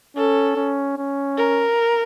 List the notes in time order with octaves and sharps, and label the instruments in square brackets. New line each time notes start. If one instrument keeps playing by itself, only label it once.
[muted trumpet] C#4 [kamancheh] A4
[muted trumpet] C#4
C#4
[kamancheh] A#4